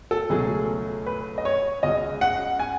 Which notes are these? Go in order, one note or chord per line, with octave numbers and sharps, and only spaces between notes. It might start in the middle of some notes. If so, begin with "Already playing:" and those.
A4
C#2 B2 F#3 A3 G#4
B4
D#5
C#5
C#2 C#3 G#3 D#5
F#5
G#5